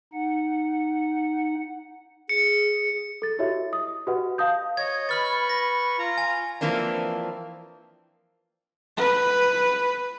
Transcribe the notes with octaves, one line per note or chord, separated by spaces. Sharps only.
D#4 F#5
G#4 C#7
A4 A6
E4 F#4 G4 C#5 D#5 E5
D#6
F#4 G4 B4 D#5 F#5
F5 A5 D#6 G6
C#5 D#5 G#6
B4 B5 C#6 F6 A6
A#6
F4 A#5
G#5
E3 F3 A#3 C4 D4
B4